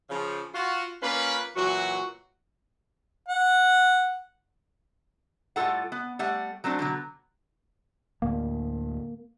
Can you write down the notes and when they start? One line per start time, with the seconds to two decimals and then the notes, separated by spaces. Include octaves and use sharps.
0.10 C#3 F3
0.55 F4 F#4
1.03 A#3 C#4 F4 B4
1.56 A#2 E3 F#3 F#4
3.28 F#5
5.56 A2 G3 F4 A4 F#5
5.92 B3
6.19 G3 A3 F#5
6.64 F#3 A3 C4 D4
6.79 B2 D3 F#3
8.22 D2 A2 A#3